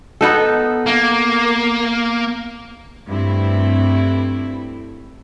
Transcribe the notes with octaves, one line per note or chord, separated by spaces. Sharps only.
B3 D#4 A4
A#3
G2 A3 C4 E4